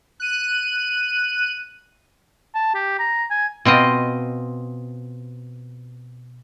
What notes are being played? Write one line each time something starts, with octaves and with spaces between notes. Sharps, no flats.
F#6 D#7
A5
G4
A#5
G#5
B2 C4 F4 D#5